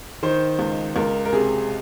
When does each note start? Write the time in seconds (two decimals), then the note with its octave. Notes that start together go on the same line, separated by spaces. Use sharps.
0.23 D#3 C5
0.59 C#2
0.95 C#2 A#4
1.25 A#4
1.33 C3 G#4